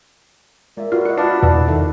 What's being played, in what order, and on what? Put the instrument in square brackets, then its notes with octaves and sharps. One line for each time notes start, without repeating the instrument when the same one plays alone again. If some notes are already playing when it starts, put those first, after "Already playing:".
[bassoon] A#2 [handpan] G#3 E5
[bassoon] A#2 [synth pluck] F4 [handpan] F#4 B4
[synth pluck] F#4 [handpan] D5 D#5
[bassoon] D4 [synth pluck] F4 [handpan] B4 F5 F#5
[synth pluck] E2 B2 [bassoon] D4 [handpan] F#4 B4
[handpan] C3 D#3 D#4 [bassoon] A3